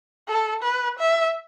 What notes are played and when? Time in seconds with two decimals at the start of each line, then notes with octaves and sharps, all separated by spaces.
0.28 A4
0.63 B4
0.99 E5